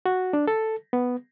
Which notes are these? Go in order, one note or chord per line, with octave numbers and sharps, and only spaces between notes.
F#4
D4
A4
B3